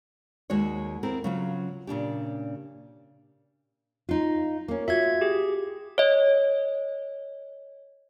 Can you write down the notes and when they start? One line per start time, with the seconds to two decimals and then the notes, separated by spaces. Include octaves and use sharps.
0.50 D#2 G#3 F#4 C#5
1.03 C4 E4 G#4 A#4
1.24 C#3 F#3 F4
1.87 A#2 C#3 D4 G4
4.09 D#4 F4
4.68 A#3 C#4
4.88 F4 F#4 E5 G#6
5.21 G4 G#4
5.98 C#5 D#5